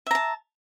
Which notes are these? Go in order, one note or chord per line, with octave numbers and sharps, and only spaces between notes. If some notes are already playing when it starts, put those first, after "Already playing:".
E5 A5 A#5